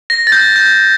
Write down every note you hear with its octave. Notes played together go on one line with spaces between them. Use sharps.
A#6
A6
G6
G6